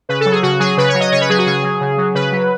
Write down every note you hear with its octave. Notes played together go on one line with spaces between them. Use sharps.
C#3 B4
A4
F#3
G#4
C#3 F#4
F#3 G#4
C#3 B4
C#5
F#3
D#5
C#3 C#5
B4
F#3 G#4
F#4
C#3 G#4
F#3
C#3
F#3
C#3 B4
F#3